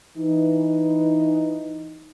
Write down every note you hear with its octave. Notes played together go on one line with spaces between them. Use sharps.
E3 D#4